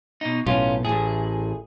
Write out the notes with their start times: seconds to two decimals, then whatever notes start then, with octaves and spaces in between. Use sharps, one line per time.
0.21 B2 D#4
0.46 B1 A2 C#4 F4
0.85 A1 A2 G#4